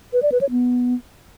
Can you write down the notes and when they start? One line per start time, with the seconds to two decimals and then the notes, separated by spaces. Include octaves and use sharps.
0.13 B4
0.22 D5
0.32 B4
0.41 C#5
0.51 B3